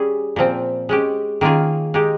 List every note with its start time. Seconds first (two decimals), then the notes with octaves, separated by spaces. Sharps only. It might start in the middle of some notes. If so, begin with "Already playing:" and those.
Already playing: G3 C#4 G#4
0.36 A#2 F3 C4
0.89 G#3 C#4 G4
1.41 D#3 A#3 C#4 F4 G#4
1.94 G#3 D#4 G4